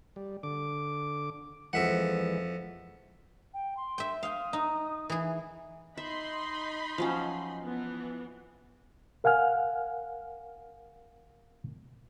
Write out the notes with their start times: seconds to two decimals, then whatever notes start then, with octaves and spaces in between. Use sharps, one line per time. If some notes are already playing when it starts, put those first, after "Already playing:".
0.16 G3
0.43 D3 D6
1.73 F2 E3 G#3 E5 F#5
3.54 G5
3.77 C6
3.98 E5 G5
4.23 F5 G5 D#6
4.53 D#4
5.10 E3 G#4
5.97 D#4 E5 B5 C6
6.98 F3 F#3 C#4
7.62 E3 B3
9.24 A#4 F5 F#5 G#5 F6